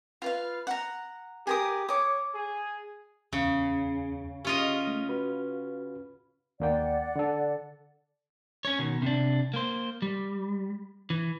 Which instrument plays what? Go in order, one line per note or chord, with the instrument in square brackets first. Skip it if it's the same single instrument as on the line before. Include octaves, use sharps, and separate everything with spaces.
[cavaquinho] F4 B4 F5
F#5 A#5
[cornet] G4 [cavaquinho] G#4 A#4 D#6
[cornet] C#5 [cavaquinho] D6 D#6
[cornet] G#4
[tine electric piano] E2 G#4 [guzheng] C#3
[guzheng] C#4 F4 D#5 [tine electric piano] G4
[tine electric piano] A3
F#4 B4 B5
[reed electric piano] D#2 A#3 G5 [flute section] D5 F#5
[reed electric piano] D3 A4
[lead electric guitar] C#4 C#5
B2 D#3
C3 D4
A#3 C5
G3
E3